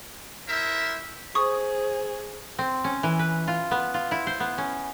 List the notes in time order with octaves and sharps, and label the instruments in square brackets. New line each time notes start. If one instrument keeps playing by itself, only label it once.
[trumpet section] E4 A#4 C5 E5
[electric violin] G#4 [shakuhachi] C5 [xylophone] C#6 D#6
[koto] C4
C#4
E3
B4
F4
B3
F4
E4
C5
B3
C#4